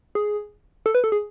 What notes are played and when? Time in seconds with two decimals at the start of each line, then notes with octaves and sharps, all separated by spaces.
0.15 G#4
0.86 A4
0.95 B4
1.04 A4
1.12 G#4